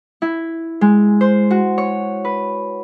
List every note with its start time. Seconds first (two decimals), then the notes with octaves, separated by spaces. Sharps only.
0.22 E4
0.81 G#3
1.21 C5
1.51 F#4
1.78 C#5
2.25 B4